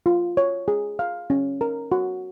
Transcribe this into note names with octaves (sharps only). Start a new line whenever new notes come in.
F4
C#5
G#4
F5
C#4
A#4
F#4